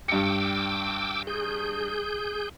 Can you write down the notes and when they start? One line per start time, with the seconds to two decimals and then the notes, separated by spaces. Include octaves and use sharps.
0.08 G2 G5 D6 E6 C#7
1.27 G#4 G6